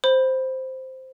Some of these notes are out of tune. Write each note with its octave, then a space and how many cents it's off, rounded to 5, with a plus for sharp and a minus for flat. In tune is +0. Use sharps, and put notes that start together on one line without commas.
C5 +0 B5 +0